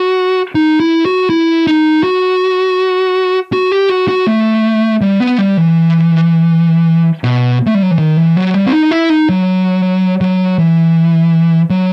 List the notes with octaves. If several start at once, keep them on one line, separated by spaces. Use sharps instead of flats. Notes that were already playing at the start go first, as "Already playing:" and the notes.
Already playing: F#4
D#4
E4
F#4
E4
D#4
F#4
F#4
G4
F#4
F#4
A3
G3
B3
G3
E3
B2
A3
G3
F#3
E3
D#3
E3
F#3
G3
C4
D#4
E4
D#4
F#3
F#3
E3
F#3